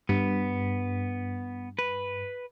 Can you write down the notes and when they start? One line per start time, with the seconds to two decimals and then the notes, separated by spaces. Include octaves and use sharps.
0.09 G2 B3
1.79 B4